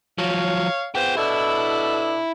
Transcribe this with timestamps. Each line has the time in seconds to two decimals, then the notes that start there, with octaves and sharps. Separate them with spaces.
0.18 F3 F#3 C#5 F5
0.95 B3 F4 G#4 C5 G5
1.17 B2 D4 E4 A4